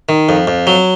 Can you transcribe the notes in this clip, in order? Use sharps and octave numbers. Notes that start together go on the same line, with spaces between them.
D#3
F2
F2
F#3